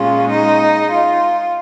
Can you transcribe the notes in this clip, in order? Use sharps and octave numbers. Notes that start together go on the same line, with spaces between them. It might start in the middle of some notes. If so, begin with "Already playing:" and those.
Already playing: A#2 G#3 C#4 F4
D#4
F4